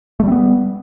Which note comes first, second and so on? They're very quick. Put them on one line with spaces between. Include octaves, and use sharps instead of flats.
A3 G3 C4 B3